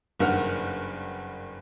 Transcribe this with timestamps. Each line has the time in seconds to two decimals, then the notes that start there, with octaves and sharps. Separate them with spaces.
0.20 F#1 G2 D#3 F#5 F6